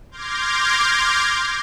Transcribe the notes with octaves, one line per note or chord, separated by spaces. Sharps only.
C6 D6 F6 G6 G#6 A#6